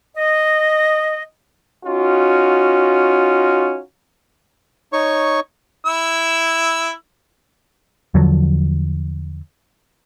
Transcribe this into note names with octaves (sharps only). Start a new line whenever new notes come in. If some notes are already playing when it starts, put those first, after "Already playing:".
D#5
C#4 D#4 F4 F#4
D#4 C#5 C#6
E4 E6
E2 D3 F3 F#3